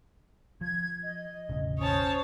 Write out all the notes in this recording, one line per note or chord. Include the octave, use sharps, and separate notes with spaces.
F3 G#6
D#5
E1 A1 C#3
C#4 C5 C#5 A5 D#6